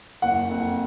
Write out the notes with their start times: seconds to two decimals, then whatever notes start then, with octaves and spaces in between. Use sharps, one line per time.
0.22 F#1 F#5
0.51 F2